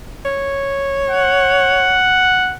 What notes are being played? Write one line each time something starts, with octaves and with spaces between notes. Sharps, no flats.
C#5
F#5